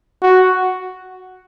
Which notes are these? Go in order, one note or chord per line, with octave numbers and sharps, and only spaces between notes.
F#4